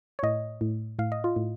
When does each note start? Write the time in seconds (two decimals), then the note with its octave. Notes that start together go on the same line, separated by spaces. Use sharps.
0.19 C#5
0.23 A2 D#5
0.61 A2
0.99 A2 F5
1.12 D#5
1.24 F4
1.36 A2